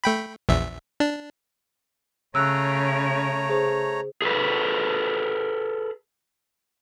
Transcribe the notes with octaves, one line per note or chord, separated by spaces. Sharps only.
A3 G5 B5
A#1 E2 E5
D4
C#3 A3 C#5 A#5 E6 F#6
G#4 C5
G#4 A4 B4